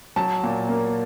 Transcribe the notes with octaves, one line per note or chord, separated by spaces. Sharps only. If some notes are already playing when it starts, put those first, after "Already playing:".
F#3 A5
A#2
A#3